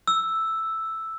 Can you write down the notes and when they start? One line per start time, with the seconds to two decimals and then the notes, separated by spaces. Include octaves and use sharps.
0.07 E6